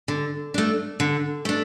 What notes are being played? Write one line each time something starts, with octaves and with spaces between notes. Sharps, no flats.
D3
A3 D4
D3
A3 D4